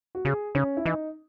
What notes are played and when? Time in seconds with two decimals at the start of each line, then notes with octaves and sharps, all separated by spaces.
0.15 F#4
0.25 C#3 G#4
0.55 C#3 C#4
0.77 E4
0.85 E3 D#4